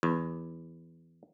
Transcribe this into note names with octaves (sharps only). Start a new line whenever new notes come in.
E2